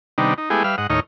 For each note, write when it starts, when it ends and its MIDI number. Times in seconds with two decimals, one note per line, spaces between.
0.18 0.34 48
0.18 0.34 51
0.18 0.34 55
0.18 0.34 59
0.18 0.34 62
0.18 0.34 63
0.38 0.49 63
0.50 0.63 56
0.50 0.63 57
0.50 0.63 59
0.50 0.63 64
0.50 0.63 67
0.50 0.63 68
0.64 0.76 55
0.64 0.76 71
0.64 0.76 76
0.64 0.76 77
0.64 0.76 89
0.78 0.87 44
0.78 0.87 75
0.78 0.87 78
0.90 1.00 39
0.90 1.00 45
0.90 1.00 63
0.90 1.00 73
0.90 1.00 75
0.90 1.00 89